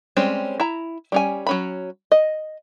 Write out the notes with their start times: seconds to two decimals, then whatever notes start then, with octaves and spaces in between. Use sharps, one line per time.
0.17 G3 G#3 C4 C#4
0.60 E4 A#5
1.12 G3 C#4 G#5
1.47 F#3 C#4 B5
2.12 D#5